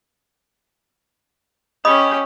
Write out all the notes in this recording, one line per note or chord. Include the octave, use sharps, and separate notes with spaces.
C#4 G4 D#5 B5 D#6